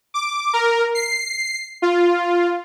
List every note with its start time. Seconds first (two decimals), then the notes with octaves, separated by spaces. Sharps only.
0.14 D6
0.53 A#4
0.95 C7
1.82 F4